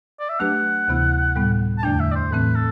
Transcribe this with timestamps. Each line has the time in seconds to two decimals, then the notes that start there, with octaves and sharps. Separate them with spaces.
0.20 D5
0.29 E5
0.39 F#3 A3 D4 G4 B4 F#5
0.87 D2 C3 E3 B3 E4
1.36 A2 G3 B3
1.78 A5
1.83 E2 D3 A3 D4 G5
2.00 E5
2.11 D5
2.15 C5
2.31 A2 E3 A3 C4 B4
2.55 A4